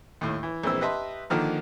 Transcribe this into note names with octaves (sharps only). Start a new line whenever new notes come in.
D#2 A2
E3
A#1 E3 G#3 C4 E6
G4 B4 D#5 E5 A5 C6
D3 D#3 F3 A#3